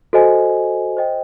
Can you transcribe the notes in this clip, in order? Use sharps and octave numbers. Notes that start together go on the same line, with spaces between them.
F#4 A4 C5 D#5 G#5
C5 D#5 G5